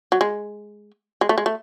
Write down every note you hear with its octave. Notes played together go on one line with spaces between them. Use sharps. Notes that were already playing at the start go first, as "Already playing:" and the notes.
F#3
G#3
G#3
A3
G#3
A3